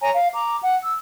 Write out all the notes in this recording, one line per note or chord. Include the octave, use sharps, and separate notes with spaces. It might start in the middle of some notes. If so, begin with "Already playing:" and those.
C#5 G#5 A#5
F5
A#5 D6
F#5
E6